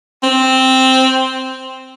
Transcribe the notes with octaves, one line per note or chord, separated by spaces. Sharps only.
C4